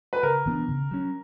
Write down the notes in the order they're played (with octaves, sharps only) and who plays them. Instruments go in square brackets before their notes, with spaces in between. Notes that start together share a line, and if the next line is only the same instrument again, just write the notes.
[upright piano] B4
[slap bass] C#3 [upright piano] A#4
[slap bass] E3 B3 D4
C#3
F#3 C#4